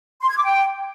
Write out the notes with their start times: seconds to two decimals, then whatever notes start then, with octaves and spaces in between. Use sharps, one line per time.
0.21 C6
0.28 G#6
0.36 D6
0.44 G5